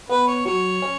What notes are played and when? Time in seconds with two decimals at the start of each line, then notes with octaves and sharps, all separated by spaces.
0.09 B3 B4
0.28 C#5
0.46 F#3 C#5
0.82 C#4